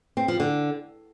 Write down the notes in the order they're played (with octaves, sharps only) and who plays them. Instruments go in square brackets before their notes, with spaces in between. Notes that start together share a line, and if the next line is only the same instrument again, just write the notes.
[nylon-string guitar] C4
F3
D3